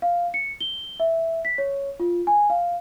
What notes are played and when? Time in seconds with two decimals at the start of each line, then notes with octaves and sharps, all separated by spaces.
0.02 F5
0.34 C#7
0.60 G7
1.00 E5
1.45 B6
1.58 C#5
2.00 F4
2.27 G#5
2.50 F5